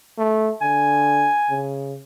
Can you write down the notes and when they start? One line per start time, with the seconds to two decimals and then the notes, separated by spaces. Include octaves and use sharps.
0.18 A3
0.61 D3 G#5
1.50 C#3